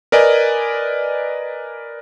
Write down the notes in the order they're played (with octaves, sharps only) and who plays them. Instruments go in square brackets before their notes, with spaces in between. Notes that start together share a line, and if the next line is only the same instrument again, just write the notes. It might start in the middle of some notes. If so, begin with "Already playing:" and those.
[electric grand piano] A#4 B4 D5 D#5 G#5